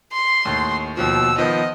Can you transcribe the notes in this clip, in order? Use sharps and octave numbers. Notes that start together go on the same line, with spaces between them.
C6
D#2 A2
D#2 B2 F3 E6
D#3 F3 B3 D#5